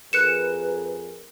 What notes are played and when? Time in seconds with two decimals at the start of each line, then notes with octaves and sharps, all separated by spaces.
0.13 F2 G#4 A#4 B4 F#6 C#7 E7